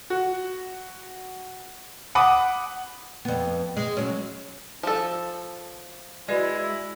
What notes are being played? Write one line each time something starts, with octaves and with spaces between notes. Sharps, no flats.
F#4
F#5 B5 D6 D#6
F2 B3
G#3
F#3 C#4
F3 A4
G#3 E4 F#4 B4 D5